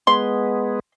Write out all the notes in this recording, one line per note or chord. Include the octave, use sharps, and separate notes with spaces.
G#3 B3 C6